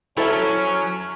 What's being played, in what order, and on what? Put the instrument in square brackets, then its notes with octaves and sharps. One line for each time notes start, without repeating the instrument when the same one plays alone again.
[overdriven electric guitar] F#3 [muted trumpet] C#4 [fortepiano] E4 A4 A5